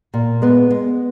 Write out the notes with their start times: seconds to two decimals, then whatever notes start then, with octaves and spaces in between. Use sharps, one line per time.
0.14 A#2
0.42 G#3 B3
0.71 G#3